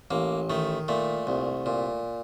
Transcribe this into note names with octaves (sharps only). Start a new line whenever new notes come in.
A1 A#3
D#3 A3
A#2 A3
C2
A#2